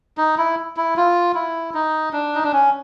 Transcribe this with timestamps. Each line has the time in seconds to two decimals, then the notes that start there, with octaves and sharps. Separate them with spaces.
0.18 D#4
0.38 E4
0.77 E4
0.97 F4
1.35 E4
1.74 D#4
2.13 D4
2.35 D#4
2.43 D4
2.53 C#4